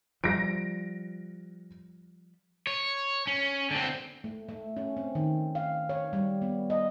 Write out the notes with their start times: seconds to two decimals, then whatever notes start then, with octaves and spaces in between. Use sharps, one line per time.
0.24 F3 G3 A#6 D7
2.67 C#5
3.27 C#4
3.71 D3 C4
4.24 A3
4.49 A3
4.77 C#4
4.97 C4
5.15 D#3
5.55 F5
5.89 C#5
6.13 G3
6.42 B3
6.70 D#5